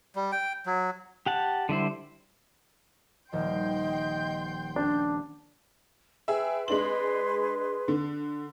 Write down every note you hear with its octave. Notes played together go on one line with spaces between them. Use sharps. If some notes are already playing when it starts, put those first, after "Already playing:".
G3
G5
F#3
G4 F#5 A5
D3 G3 E4 C5
D#1 D#3 F3 D#5 G5 C6 G6
C#4 D4
G#4 B4 E5 G5
G#3 D4 G#4 B4 C6 F#7
D3